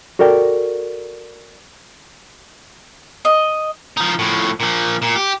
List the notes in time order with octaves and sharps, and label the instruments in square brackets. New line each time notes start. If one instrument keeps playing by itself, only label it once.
[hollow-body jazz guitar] F#4 A4 A#4 D5 G5
[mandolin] D#5
[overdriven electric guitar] F3 D#4
A2 F3
A#2 F3
A#2
G4